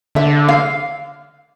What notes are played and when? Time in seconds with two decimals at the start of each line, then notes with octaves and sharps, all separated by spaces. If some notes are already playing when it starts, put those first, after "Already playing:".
0.15 D3 E5
0.48 F5